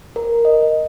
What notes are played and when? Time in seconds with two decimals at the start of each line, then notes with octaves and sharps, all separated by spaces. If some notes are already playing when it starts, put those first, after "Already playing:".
0.16 A#4
0.45 D#5